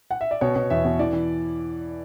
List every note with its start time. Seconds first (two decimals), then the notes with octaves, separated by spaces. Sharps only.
0.11 F#5
0.21 E5
0.31 D5
0.41 B2 C#5
0.56 B2
0.70 E2 E5
0.85 B2
0.99 E3 D5
1.13 E3